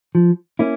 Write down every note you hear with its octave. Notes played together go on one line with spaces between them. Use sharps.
F3
A#3 C#4 E4